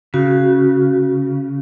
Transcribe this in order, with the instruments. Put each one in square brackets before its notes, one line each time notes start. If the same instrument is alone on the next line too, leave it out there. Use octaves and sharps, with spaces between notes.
[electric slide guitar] C#3 [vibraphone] F#4